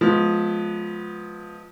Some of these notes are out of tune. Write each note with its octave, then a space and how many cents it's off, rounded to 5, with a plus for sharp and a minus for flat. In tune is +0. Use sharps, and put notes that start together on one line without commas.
F3 +15 G#3 +30 B3 +0